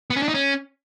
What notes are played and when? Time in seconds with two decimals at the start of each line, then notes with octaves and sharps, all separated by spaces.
0.10 B3
0.16 C#4
0.22 D4
0.28 D#4
0.34 C#4